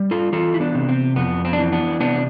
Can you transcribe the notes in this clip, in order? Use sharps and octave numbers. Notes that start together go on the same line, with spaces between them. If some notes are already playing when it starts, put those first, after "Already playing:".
Already playing: G3
F4 A4
E3 F4 A4
E4
B3 D4
C3
C4
F2 B3
C4
D4
E3 C4
B3 D4
C3 B3 D4